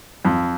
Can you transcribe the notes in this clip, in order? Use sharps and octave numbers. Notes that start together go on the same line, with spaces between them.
F2